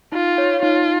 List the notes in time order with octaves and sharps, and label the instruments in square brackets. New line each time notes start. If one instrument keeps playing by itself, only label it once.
[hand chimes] D#4 [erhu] F4
[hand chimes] C#5 F5
[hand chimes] D#4 [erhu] F4